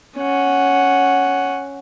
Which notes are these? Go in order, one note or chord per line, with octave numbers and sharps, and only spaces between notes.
C#4 F#5